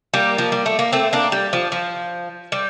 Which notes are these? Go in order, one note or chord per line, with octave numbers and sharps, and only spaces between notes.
G3 A#3
F3
G3
A3
A#3
A3 C4
A#3 D4
G3
F3
F3
G3